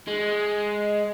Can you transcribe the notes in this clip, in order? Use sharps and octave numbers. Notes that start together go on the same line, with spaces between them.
G#3